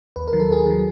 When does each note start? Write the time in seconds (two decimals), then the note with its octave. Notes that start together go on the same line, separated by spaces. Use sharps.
0.16 D#2 B4
0.28 A#4
0.33 D#3 F#3
0.40 A4
0.50 D#2 G#4 A#4
0.66 D#3 F#3